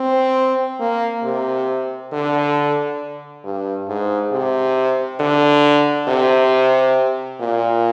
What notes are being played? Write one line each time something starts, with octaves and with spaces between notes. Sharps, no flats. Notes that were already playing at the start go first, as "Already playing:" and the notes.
Already playing: C4
A#3
C3
D3
G2
G#2
C3
D3
C3
A#2